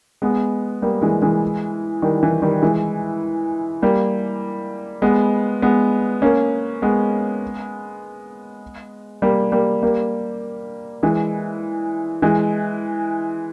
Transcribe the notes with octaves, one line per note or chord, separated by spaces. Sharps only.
G#3 B3
G3 A#3
E3 G#3
E3 G#3
D#3 G3
E3
D#3 G3
E3 G#3
G3 A#3
G#3 B3
G#3 B3
A#3 C#4
G#3 B3
G3 A#3
G3 A#3
G3 A#3
E3 G#3
E3 G#3